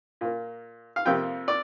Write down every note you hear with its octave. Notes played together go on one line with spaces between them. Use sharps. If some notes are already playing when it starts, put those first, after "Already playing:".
A#2 A#3
F5
F2 C3 F3 A#3 G5
D5